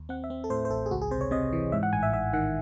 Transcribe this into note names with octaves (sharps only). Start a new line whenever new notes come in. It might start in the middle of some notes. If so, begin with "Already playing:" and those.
Already playing: D#2
C4 F#5
E5
C4
A4
A2 C5
C5
A1 A4
G#4
C#2 F#4
G#4
C3 C5
C#5
C3 D#5
E3
G#2 E5
F#5
A1 G#5
E5
G#2 E5
D#3 F#5